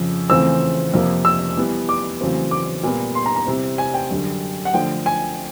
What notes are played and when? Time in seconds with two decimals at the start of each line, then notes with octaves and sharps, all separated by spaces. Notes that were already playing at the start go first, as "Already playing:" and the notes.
Already playing: F2 C#3 F3
0.30 E2 C#3 F3 A3 C4 E6
0.94 F2 C3 F3 A#3
1.25 E6
1.57 E3 G3 B3
1.89 D6
2.21 E2 C#3 F#3 A3 C4
2.51 D6
2.83 A#2 G3 B3
3.15 C6
3.26 A#5
3.36 A#5
3.47 C3 E3 G3 C4
3.78 G#5
3.94 G5
4.11 F#2 D3 G3
4.65 F#5
4.74 D3 F3 A3 G5
5.06 G#5